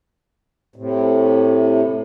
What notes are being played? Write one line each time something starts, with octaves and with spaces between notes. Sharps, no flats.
A2 C3